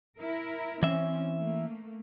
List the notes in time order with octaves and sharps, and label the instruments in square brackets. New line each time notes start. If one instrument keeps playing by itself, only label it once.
[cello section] E4 A#4
[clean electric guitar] E3 E5 [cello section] C4 C#4
[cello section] A3 A#3